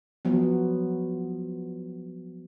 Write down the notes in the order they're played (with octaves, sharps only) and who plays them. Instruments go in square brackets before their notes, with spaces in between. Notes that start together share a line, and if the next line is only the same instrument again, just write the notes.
[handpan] F3 F#3 B3